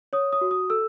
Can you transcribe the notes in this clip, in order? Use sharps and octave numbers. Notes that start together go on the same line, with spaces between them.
C#5 D#6
D#6
F#4
D#6
A4 E6